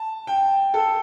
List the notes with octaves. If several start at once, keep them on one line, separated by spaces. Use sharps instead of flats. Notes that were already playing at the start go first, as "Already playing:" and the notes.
Already playing: A5
G5
A4